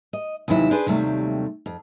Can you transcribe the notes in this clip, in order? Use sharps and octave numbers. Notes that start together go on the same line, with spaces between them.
D#5
D#2 C3 E3 F#3 E4
D4 G#4 B4 C5 D5
D#2 C3 F#3 G3 A3
F2